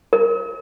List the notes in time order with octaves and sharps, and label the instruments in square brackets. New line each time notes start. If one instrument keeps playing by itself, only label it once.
[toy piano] A#4